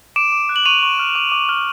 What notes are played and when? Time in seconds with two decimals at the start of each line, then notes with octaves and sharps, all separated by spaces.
0.16 D6 D7 E7
0.32 D6
0.49 F#6
0.56 F#7
0.65 C#6 D#7 F7
0.83 C#6
0.99 F6
1.15 D6
1.32 D6
1.49 F6